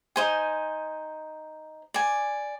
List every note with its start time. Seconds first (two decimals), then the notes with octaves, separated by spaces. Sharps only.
0.16 D#4 C5 G#5
1.94 D5 G#5